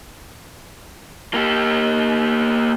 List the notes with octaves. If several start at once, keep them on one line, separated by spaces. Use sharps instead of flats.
A#3 G4